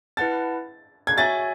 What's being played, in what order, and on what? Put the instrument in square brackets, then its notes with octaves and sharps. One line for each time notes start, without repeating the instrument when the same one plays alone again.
[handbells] E4 B4 F#5 A5 [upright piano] A6
[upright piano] G#6
[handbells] F#4 C#5 E5 G#5 [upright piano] A6